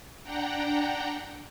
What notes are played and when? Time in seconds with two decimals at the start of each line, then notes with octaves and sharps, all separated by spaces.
0.23 D4 F#5 G5 A#5